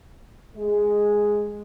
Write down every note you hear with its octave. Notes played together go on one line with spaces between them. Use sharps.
G#3